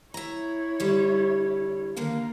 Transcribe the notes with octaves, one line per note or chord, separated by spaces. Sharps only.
E4 C#5 E5 A#5
D3 G3
D3 D#3 A#3 A#4 F5